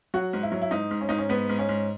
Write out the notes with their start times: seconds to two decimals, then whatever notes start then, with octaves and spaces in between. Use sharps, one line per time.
0.14 F#3 F#4
0.33 G#2
0.43 E4
0.52 F#3
0.62 E4
0.71 G#2 D#4
0.91 G#2
1.01 C#4
1.09 G#2 D#4
1.18 C#4
1.29 G#2 B3
1.49 G#2
1.58 C#4
1.69 G#2